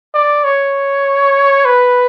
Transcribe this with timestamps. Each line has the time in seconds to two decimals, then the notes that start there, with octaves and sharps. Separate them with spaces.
0.14 D5
0.44 C#5
1.65 B4